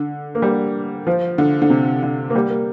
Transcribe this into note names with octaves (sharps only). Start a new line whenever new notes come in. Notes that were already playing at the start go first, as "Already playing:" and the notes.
Already playing: D3
A#3
G3
F3
D3
D3
C3
D3
A#3
G3
A#3